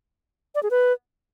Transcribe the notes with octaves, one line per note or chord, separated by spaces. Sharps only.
D5
G#4
B4